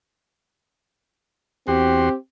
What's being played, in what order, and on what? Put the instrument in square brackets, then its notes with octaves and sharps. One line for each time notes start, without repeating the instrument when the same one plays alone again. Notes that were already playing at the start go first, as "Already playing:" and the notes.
[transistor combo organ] E2 F#4 C6 [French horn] C4 [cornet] G4